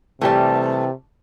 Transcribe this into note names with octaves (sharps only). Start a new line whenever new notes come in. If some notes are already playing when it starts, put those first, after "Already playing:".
C3 E3 G3 A3 G4 A5